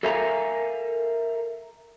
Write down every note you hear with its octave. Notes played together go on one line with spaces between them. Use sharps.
A4 A#4 E5 F5 G#5 A#5